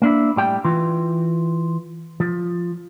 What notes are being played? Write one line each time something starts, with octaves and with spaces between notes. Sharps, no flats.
A#3 D4 E4
A2 G3 G5
E3 F4
F3